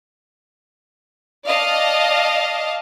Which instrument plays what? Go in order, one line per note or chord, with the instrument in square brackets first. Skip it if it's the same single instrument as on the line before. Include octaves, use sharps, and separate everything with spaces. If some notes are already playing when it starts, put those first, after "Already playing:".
[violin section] D5 D#5 F5 A5